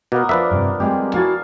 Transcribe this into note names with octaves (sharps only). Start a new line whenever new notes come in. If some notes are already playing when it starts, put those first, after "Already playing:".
B2 A#3 B3 A#4
F3 D4 A#4 B4 E5
G2 C3
G3 G#3 C4 G4
E4 F#4 F5 F#5 G#5 A5